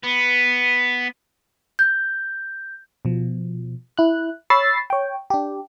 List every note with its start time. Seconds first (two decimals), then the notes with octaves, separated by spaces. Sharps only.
0.03 B3
1.79 G6
3.05 B2 F3
3.98 E4 F#6
4.50 C#5 B5 C#6 E6 A6 C7
4.90 C#5 G5
5.30 D4 G4